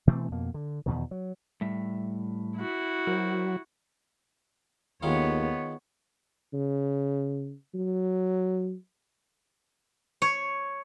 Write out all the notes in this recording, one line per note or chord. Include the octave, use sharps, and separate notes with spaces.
B2 E3 A3 C4
F2 B2 A#3
D3
E2 B2 D#3
F#3
A2 G3 E5
E4 F#4
F#3 A#4 C5
D#2 D#3 G#3 B3 F4 C#5
C#3
F#3
C#5